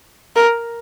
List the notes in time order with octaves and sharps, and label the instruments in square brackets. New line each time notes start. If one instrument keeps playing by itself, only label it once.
[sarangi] A#4